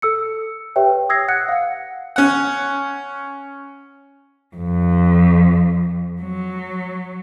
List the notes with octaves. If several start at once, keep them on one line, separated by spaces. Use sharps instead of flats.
A4 E6 C#7
G4 B4 C#5 E5 G5
D#6 E6 G#6 A#6 C7
F#5 F#6 C#7
F5 F#5
C#4 F#5
F2
F#3